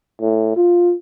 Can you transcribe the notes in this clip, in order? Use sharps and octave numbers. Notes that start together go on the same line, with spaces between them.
A2
F4